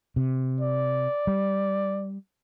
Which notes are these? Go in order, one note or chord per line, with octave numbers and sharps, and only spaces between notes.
C3
D5
G3